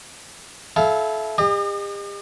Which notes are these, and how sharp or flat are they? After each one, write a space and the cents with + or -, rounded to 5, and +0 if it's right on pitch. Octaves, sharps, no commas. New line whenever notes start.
E4 +0 A4 -30 F5 +0
G4 +45 D#5 -35